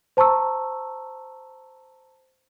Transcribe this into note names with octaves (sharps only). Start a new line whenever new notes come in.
C5 A5 A#5 C#6 E6